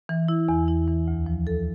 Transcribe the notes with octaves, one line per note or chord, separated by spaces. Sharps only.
E3
E4
E2
E4
E3
D2
F3
A4